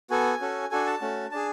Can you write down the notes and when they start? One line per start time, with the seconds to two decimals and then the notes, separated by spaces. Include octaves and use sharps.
0.10 B3 F#4 A4 G#5
0.41 C#4 F#4 A4
0.71 D4 F#4 A4 G#5
0.86 A5
1.01 A3 C#4 F#4
1.31 D4 G#4 A5